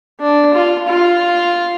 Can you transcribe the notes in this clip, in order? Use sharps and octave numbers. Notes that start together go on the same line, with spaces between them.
D4
F4
F4